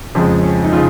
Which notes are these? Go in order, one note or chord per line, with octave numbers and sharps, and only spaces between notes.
F2 C#3 F3 G#3 C#4
C#4
D#4
C#3 F4